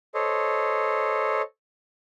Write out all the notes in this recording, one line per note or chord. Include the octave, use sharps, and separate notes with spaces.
A4 C5 C#5 D#5